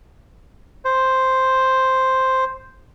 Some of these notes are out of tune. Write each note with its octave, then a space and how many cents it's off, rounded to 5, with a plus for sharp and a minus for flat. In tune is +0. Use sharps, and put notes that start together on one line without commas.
C5 +0